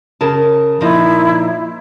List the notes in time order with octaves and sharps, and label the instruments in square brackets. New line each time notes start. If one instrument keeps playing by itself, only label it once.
[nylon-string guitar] C#3 A#4 A5
[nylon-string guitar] A#2 F3 D#4 [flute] E4